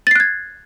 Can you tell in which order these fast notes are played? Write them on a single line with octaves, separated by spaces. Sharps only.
A6 C7 F#6 G#6